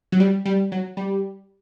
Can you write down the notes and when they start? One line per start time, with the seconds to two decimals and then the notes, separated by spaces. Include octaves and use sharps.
0.12 F#3
0.20 G3
0.45 G3
0.72 F#3
0.97 G3